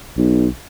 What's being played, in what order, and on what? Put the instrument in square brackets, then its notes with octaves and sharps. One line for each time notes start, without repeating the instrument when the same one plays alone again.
[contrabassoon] B1